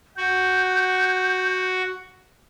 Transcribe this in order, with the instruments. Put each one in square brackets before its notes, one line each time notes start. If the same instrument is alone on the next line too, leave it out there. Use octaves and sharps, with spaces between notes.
[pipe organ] F#4 [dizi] G6